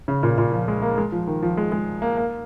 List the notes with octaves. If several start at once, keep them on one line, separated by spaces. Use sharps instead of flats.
C#3
A#2
A#2
F3
G#3
A#3
G#3
F3
D#3
F3
G#3
G#3
A#3
A#3